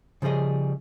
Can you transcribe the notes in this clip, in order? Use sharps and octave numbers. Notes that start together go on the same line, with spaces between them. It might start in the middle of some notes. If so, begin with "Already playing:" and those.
C#3 F3 G3 G#4 D#5